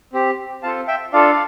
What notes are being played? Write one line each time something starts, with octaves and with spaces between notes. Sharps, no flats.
C4 G4
C4 F4 A4 F5 A5
E5 G5
D4 F4 A4 D5 F5